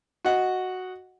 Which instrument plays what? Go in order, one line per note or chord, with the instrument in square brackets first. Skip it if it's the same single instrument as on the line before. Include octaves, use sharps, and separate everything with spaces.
[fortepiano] F#4 D#5 F#5